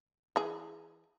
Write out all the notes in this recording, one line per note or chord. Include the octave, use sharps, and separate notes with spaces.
E3 G#4